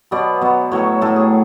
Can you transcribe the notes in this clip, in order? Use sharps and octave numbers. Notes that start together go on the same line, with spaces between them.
B2 F#3 B3 D5
B2 F#3 B3
A2 F#3 A3 C#5
A2 F#3 A3 A4
G#4